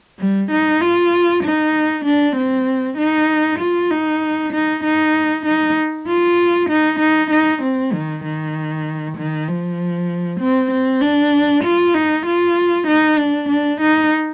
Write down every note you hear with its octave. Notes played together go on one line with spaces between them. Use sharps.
G3
D#4
F4
D#4
D4
C4
D#4
F4
D#4
D#4
D#4
D#4
F4
D#4
D#4
D#4
C4
D#3
D#3
D#3
F3
C4
C4
D4
F4
D#4
F4
D#4
D4
D4
D#4